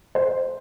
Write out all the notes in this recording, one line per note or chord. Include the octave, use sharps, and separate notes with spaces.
C5